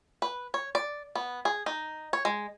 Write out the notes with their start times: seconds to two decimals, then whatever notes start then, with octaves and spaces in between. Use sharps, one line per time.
0.22 B4
0.54 C#5
0.75 D5
1.15 B3
1.45 G#4
1.66 D#4
2.13 C#5
2.25 G#3